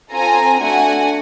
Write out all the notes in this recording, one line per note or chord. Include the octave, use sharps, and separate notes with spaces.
C4 F4 A4 G#5 A#5
A3 D4 F#4 F#5 G#5